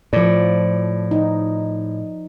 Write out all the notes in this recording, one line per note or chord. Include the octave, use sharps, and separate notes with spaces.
A2 F3 D5
D#4